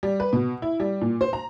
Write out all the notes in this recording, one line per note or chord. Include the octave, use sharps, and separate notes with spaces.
G3
B4
B2
E4
G3
A#2
C5
A#5